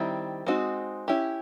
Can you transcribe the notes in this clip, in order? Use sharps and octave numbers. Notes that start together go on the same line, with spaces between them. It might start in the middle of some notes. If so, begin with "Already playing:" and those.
Already playing: D#3 G3 C4 E4
G#3 C4 D#4 F#4
C#4 E4 G4